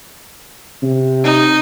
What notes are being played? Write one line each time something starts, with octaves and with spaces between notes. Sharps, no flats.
C3
D#4